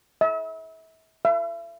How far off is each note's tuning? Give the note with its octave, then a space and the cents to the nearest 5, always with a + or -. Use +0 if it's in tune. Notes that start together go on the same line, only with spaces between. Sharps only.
E5 -35
E5 +40